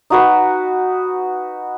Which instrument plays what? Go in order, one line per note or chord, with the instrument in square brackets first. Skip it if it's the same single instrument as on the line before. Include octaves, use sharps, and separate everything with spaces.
[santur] D#4 F#4 B4